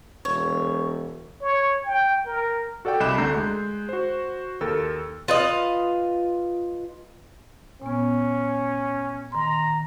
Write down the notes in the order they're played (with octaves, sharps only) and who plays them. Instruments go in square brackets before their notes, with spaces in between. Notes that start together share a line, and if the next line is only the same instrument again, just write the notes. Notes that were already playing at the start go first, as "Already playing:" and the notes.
[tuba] E1 [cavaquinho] C#5
[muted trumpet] C#5
G5
A#4
[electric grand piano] F#4 A4 D5 F#5 G5
C2 D#5 B5 D6 F#6 E7
D2 D3 A3 A#5 G6 C7
G#3
F#4 C5
D#2 A4 A#4 E6
[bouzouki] F4 B4 D#5 F5
[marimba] A#2 B3 [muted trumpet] C#4
[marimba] D#3 C6 [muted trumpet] A#5